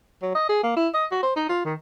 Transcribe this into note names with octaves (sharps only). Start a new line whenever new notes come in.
F#3
D#5
G#4
A#3
E4
D#5
F#4
C5
D#4
F4
D#3